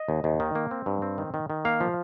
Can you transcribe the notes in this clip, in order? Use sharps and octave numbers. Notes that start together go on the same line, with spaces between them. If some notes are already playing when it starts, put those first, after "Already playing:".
Already playing: D#5
D#2
D#2
D#3
A#3
C4
G2
C4
D#3
D#3
D#3
A#3 F5
F3